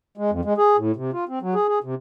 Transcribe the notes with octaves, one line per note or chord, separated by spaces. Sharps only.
G#3
F2
G#3
G#4
A2
C3
F4
C4
F#3
G#4
G#4
C3